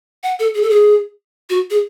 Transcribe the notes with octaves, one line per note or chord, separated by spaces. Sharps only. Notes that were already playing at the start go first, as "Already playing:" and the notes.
F#5
A4
G#4
A4
G#4
F#4
G#4